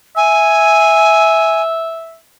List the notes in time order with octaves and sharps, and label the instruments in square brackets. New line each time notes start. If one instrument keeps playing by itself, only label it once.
[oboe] E5 [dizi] G#5